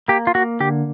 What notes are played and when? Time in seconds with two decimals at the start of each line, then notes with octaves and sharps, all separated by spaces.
0.08 A#3 G4
0.27 F4
0.35 A#3 F#4
0.60 D3 G4